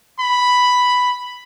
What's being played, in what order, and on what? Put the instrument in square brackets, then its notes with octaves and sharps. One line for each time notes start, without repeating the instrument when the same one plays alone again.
[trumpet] B5